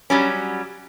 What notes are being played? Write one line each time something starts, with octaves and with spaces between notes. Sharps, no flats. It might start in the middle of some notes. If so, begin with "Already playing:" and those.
F#3 G3 C#4